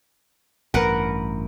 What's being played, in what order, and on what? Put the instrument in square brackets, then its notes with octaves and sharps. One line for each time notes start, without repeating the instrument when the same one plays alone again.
[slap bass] A1 G2 [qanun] A#4 B4 F#5